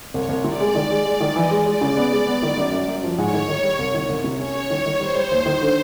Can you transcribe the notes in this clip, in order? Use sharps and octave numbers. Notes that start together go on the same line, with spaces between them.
C2 C#5
C2
C3 D5
G#3
D#3
G#3
G#3
D#3
E3 D#5
G#3
G#3 D5
C#3
B3
G#3
B3
D#3
F#2
F#2
F#2
F3
G#2 C#5
D#3
D#3
G3
C2
D#3
C2
C3
C#4 C#5
C#4
D#3 C#5
D#3
G3 C5
G3
D#2
D#3
D3